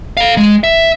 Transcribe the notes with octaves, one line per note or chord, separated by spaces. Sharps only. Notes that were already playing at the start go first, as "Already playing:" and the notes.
A4 F5
G#3
E5